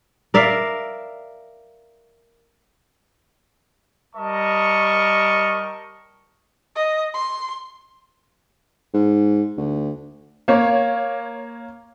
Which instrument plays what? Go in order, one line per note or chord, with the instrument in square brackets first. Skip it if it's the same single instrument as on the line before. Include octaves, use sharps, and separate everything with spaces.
[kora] A#4 D5 E5 F5
[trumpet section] G3 A#4 D#5 A5 C#6
[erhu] D#5
C6
[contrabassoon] G#2
D2
[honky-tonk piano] A#3 C#5